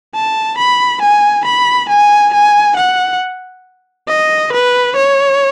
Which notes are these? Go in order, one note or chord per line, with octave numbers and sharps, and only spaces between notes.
A5
B5
G#5
B5
G#5
G#5
F#5
D#5
B4
C#5